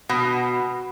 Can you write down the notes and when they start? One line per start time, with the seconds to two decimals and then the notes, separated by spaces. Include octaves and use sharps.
0.09 B2